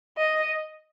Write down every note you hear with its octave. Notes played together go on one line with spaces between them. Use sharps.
D#5